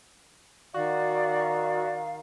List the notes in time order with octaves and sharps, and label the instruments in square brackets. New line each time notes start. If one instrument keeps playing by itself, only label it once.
[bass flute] D#3 [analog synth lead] F#4 [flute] D5 [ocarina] F5